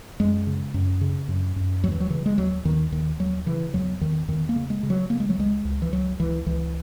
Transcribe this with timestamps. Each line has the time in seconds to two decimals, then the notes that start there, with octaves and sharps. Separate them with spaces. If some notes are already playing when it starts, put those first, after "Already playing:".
0.20 F#2 G#3
0.47 C#3
0.74 F#2
1.01 C#3
1.28 F#2
1.56 F#2
1.83 D#2 F#3
1.92 E3
2.00 F#3
2.10 C#3 E3
2.26 G#3
2.38 D#2 F#3
2.65 D#2 D#3
2.92 D#2 D#3
3.19 D#2 F#3
3.46 C#3 E3
3.74 E2 F#3
4.01 E2 D#3
4.28 E2 D#3
4.49 A#3
4.56 C#3
4.70 G#3
4.83 C#3
4.90 F#3
5.10 C#3 A#3
5.20 G#3
5.30 F#3
5.38 C#2 G#3
5.65 C#2
5.82 E3
5.92 C#2 F#3
6.20 C#2 E3
6.46 C#2 E3